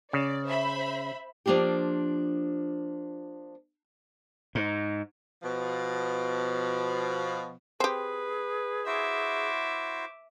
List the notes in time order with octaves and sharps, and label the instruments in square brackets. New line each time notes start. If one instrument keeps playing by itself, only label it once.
[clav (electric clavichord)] C#3 [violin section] D5
[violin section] C5 E5 B5
[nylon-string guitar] F3 A#3 D4 F4 G4
[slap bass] G#2
[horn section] B2 F3
[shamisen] C4 G4 [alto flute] G#4 [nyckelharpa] B4
[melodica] E4 F#4 C5 [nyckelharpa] E5 D6